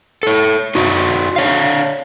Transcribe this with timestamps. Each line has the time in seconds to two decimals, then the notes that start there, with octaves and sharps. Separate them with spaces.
0.23 A4 C#5
0.75 D#4 F#4 D5
1.36 D4 C#5 F5